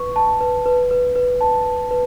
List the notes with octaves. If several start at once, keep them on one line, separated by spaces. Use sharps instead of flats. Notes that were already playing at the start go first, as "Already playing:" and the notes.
Already playing: B4 C#6
A5
B4
B4
B4
B4
A5
B4
B4